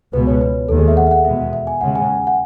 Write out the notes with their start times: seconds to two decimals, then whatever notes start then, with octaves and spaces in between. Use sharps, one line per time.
0.12 C#2 B2 G#3 B3 B4
0.27 C#5
0.41 B4
0.69 D#2 D#3 G#3 A4
0.78 G#4
0.88 E5
0.97 F#5
1.07 E5
1.11 F#5
1.24 E2 B2 G#3 B3 E5
1.53 E5
1.67 G#5
1.81 D#2 C#3 G#3 F#5
1.96 G#5
2.27 F#5